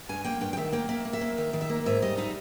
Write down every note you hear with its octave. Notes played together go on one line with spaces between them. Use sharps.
G2 G#5
A#3 G5
G2 G5
G5
D#3 E5
A#3 G5
A#3 E5
A#3
E5
A#3
D#3 E5
D#3
E5
A#3
G#2 E5
G3 D#5
D#4 E5